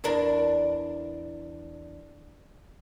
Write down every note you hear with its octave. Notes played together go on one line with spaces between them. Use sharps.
E2 D4 A#4